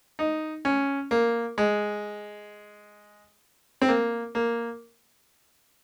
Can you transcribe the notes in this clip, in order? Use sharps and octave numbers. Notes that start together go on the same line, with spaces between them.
D#4
C#4
A#3
G#3
C4
A#3
A#3